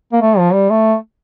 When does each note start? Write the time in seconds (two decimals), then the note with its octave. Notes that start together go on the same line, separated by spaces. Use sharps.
0.13 A#3
0.22 A3
0.38 F3
0.53 G3
0.70 A3